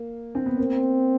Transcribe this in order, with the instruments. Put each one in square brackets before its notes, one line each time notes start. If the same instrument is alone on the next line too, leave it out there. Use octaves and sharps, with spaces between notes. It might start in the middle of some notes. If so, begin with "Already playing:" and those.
Already playing: [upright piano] A#3
C4
B3
[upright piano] A#3 [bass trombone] C4